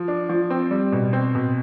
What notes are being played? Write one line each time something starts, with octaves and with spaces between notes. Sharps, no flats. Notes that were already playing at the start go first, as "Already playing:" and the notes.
Already playing: F3
D4
F3
C4
G3
B2
C4
B2